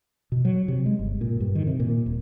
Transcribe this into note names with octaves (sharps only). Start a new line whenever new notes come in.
B2
F#3
C3
G#3
G1
A#2
G2
D#3
C3
A#2
D#1